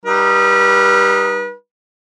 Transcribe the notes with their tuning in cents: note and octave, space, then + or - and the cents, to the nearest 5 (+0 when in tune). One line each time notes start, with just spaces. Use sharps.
G3 +0 D#4 +0 B4 -35